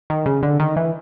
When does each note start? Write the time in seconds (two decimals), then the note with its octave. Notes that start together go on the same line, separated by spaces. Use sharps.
0.10 D#3
0.26 C#3
0.43 D3
0.60 D#3
0.76 E3